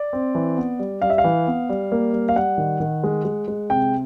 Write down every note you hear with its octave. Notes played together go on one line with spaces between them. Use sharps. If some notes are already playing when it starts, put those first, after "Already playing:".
Already playing: D5
C4
E3
B3
G3
G3 F5
E5
F5
E3
B3
G3
A#3
G3
F5
G3 F#5
D#3
D#3
G#3
G#3
G#3
C3 G5